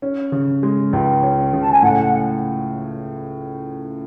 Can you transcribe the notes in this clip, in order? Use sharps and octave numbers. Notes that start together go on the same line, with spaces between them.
C#4
C#3
G#3
C#2
C#4
C#3
A5
G#5
A2 F#5